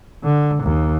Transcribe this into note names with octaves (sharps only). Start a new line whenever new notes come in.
D3
D#2